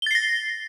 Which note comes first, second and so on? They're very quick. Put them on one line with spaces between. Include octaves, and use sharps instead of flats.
G7 A6 C7 A#6